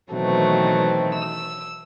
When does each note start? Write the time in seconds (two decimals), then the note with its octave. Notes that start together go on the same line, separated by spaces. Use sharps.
0.13 B2 D#3 E3 F#3 A3 C4
1.15 E6